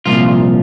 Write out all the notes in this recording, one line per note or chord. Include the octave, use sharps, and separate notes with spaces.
C2 A#2 F3 F4